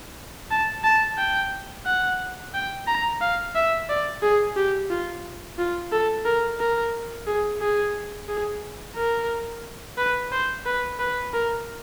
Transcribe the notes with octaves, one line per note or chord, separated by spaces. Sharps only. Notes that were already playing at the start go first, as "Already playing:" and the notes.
A5
A5
G5
F#5
G5
A#5
F5
E5
D5
G#4
G4
F4
F4
A4
A#4
A#4
G#4
G#4
G#4
A#4
B4
C5
B4
B4
A#4